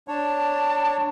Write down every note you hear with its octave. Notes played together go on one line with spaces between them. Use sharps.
D4 C#5 A5